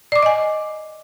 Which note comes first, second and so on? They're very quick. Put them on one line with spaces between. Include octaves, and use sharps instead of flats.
D5 D6 C#6 D#5 G#5